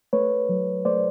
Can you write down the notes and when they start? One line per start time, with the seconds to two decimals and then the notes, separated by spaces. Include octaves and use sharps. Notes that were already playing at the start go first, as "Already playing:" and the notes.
0.13 A3 B4 C#5
0.49 F#3
0.85 A3 C5 D5